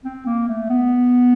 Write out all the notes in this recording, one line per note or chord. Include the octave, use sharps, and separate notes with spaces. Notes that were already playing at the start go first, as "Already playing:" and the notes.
C4
A#3
A3
B3